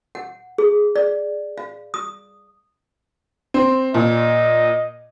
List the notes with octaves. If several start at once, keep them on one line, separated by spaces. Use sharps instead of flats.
F#5
G#4
D5
F5
D#6
C4
A#2 D#5